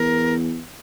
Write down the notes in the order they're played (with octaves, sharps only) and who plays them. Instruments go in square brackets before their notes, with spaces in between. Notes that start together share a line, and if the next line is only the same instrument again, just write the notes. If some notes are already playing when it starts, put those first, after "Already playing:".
Already playing: [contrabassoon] E2 [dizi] A#4